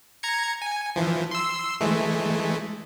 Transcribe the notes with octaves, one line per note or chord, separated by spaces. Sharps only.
A#5 G#6 C#7
G#5
E3 F3
C6 E6
E3 G#3 A3